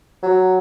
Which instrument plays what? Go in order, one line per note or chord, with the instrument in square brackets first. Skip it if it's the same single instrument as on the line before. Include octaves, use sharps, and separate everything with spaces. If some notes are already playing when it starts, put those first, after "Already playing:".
[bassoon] F#3